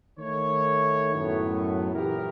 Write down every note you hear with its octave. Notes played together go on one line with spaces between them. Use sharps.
D#3 A3 C#5
F#2 A2 B3
A#2 E3 E4 G4 A#4